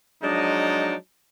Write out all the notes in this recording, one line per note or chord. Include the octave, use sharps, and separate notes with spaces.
F3 F#3 G#3 D4 D#4 D#5